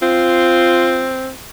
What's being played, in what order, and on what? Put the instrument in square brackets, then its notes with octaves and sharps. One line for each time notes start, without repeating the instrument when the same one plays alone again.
[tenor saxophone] C4 [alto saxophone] F4